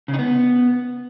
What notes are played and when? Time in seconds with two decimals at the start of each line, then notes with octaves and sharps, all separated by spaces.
0.08 C#3
0.13 D#4
0.19 B3